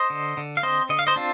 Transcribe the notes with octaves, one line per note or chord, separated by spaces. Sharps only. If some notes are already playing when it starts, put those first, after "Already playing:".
Already playing: C5 D#5
D3
D3
F5
C4 C5 D#5
D3 D#5
F5
C5 D#5
C4 D4 F4